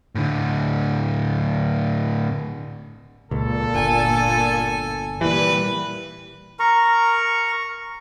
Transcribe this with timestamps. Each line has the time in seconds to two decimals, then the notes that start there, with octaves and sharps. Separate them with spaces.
0.15 A2 D3
3.31 C#2 A#2 A4
3.75 G1 G#5
5.21 A#2 E3 G3 B4
6.59 A#4 A#5 C#6